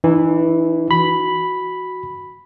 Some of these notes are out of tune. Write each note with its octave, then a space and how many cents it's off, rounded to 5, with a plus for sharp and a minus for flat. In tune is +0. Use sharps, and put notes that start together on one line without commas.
E3 +0 D#4 -40
F#4 +0 B5 +0